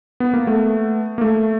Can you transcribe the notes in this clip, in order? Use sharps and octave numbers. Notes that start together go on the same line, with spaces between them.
B3
A#3
A3 B3
A#3
A3